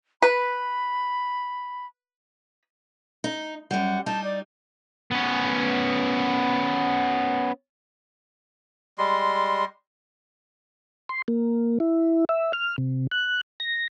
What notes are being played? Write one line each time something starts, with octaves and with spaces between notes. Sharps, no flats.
B4 B5
D#4
F#2 G3 F#5
G3 D#4 A5
D5
B3 C#4
G3 G#3 C6
C6
A#3
E4
E5
F6
C3
F#6
A#6